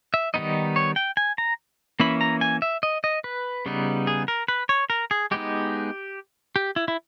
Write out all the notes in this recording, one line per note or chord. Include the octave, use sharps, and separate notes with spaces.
E5
D#3 G3 B3 D#4 D#5
C#5
G5
G#5
A#5
E3 A#3 C#4 E4 B5
A#5
G#5
E5
D#5
D#5
B4
C#3 G3 B3 D#4
G#4
A#4
B4
C#5
A#4
G#4
G#3 B3 D#4 G4
G4
E4
E4